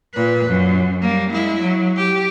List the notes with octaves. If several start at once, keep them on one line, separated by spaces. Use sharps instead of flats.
A#2 B4
F#2
G3 A#3
G#3 E4
F#3
G4